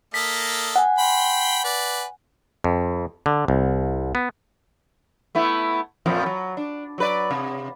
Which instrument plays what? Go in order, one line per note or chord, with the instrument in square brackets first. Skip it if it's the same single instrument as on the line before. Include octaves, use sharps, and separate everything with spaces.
[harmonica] A#3 A4 D#5 [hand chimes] B6
[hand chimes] F#5 G#5
[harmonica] G5 B5 C6
B4 D5
[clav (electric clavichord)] F2
D3
C2
B3
[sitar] A3 B3 E4
F2 A#2 F3
F#3
D4
F#3 B4 D5
C3